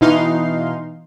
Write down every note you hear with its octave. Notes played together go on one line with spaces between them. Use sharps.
B2 E3 D#4 F5 C6